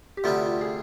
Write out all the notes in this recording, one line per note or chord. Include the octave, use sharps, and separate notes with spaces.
G4
D2 C3 G3 B3 F4
F4
G#4